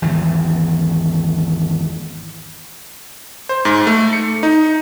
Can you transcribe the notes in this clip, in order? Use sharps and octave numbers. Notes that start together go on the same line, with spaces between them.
G#1 E2 E3
C5
G#2
A3
C#7
D#4